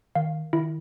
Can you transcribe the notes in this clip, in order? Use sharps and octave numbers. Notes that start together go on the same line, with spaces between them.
D#3 F5
D#3 E4